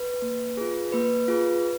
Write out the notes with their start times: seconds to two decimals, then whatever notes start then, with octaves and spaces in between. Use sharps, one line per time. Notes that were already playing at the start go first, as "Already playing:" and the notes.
Already playing: B4
0.22 A#3
0.57 F4 G#4
0.92 A#3 B4
1.28 F4 G#4